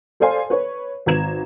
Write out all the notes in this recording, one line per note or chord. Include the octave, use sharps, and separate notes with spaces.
A4 C5 D5 F5 G#5 C6
B4 C#5
G#1 B4 A#5 G#6 E7